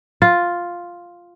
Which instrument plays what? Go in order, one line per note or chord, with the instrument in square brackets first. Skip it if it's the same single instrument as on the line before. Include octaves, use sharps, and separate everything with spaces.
[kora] F4